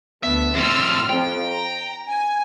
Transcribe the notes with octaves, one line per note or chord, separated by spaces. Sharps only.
D2 A3 B3 E5
F2 A2 C6 E6 F6
F2 F3 G5
A#5
G#5